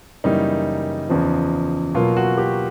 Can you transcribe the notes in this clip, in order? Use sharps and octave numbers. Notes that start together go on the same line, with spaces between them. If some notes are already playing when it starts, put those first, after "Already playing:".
F#2 C#3 E3 G3 A#3 D#4
E2 C#3 F3
B2 F#3 A#3 F4
F#4
G4